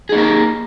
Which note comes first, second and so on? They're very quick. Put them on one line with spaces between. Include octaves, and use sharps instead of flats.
G#4 D#4 A#3 A#4